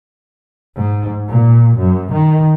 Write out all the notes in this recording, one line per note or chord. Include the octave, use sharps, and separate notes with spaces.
G#2
A#2
F#2
D#3